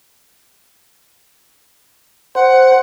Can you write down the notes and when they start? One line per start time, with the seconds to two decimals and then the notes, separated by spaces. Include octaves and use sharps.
2.35 C5 F#5